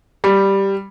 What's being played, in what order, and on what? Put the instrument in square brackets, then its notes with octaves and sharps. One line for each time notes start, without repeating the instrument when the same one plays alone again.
[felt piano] G3